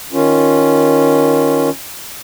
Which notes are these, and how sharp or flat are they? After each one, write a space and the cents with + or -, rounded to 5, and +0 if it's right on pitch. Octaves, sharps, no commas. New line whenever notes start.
D#3 +0 C#4 +0 F4 +0